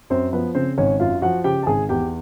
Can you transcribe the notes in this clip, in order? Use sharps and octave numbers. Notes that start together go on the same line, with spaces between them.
F#2 C4 C5
F3 B3 B4
C#3 C4 C5
G#1 C#4 C#5
F#2 F4 F5
F3 F#4 F#5
C#3 G4 G5
A5
G#1 G#4 G#5
E2 G4 G5